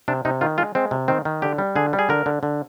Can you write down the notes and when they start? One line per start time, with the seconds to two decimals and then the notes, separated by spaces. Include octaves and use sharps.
0.08 C3 D4
0.25 C3 D#4
0.41 D#3 F4
0.58 G#3 F4
0.75 G#3 C4
0.91 C3
1.08 D#3 C4
1.25 D#3
1.42 D3 G4
1.58 G3
1.76 D3 G#4
1.93 G3
1.99 G#4
2.09 D3 A#4
2.26 D3
2.43 D3